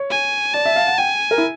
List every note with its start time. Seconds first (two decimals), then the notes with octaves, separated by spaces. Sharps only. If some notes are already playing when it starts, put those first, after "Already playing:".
Already playing: C#5
0.10 G#5
0.54 D5 A5
0.65 E5
0.76 F5
0.87 F#5
0.98 G5 G#5
1.31 A#4
1.38 E4